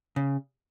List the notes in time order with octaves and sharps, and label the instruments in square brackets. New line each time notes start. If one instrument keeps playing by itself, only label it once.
[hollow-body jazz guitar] C#3